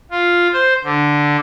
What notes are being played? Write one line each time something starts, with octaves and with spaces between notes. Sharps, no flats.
F4
C5
D3